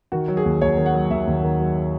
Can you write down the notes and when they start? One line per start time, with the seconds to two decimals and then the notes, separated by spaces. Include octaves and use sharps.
0.12 D#3 F#4
0.28 F#3
0.37 G#4
0.45 D#2
0.61 D#2 C#5
0.77 D#3
0.86 F#5
0.94 F#3
1.10 D#2 E5
1.27 D#2
1.43 D#3
1.59 F#3